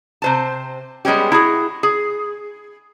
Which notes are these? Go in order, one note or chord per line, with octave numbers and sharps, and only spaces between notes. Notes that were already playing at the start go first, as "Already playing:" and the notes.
C3 C5 A5
G3 G#3 B3 C#4 G4
E4 F#4 G#4
G#4